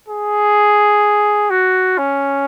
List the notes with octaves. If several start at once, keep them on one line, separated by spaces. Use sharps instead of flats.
G#4
F#4
C#4